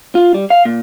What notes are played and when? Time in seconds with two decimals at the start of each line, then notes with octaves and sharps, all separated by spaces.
0.15 F4
0.34 G3
0.50 F5
0.65 A#2